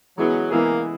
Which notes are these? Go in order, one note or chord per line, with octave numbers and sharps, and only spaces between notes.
E3 F#3 G#3 B3 E4 G#4
E3 G#3 A#3 B3 E4 G#4